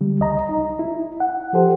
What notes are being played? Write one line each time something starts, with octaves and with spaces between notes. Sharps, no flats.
D3 G3
C#2 D#5 A#5
D#4
E4
F#5
F3 G4 A4 C5